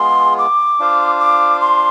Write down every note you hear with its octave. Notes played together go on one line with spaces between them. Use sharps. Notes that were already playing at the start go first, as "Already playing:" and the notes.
Already playing: G#3 B3 F4 G#4 C6
D6
D4 F4 C5 F5
D6
C6